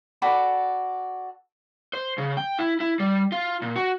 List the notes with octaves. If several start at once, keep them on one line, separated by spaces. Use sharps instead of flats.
F#4 A4 D5 B5
C5
C#3
G5
E4
E4
G3
F4
A#2
F#4